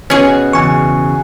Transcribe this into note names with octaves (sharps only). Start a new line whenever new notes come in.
B2 C#4 F#4 G#4
E2 C#3 G#5 C#6